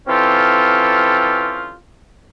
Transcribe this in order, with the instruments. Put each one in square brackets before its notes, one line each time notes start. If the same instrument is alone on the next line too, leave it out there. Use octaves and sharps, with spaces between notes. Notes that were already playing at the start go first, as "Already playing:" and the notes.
[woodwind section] E3 C4 C#4 F4 G4 A4